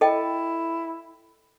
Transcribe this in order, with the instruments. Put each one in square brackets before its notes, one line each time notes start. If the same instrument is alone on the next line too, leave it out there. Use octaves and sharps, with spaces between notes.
[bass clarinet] E4 [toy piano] A4 D#5 G5